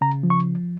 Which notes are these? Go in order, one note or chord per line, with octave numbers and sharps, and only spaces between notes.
C#3 A#5
F3
C#6